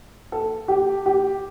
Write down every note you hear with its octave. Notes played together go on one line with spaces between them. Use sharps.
A4
G4
G4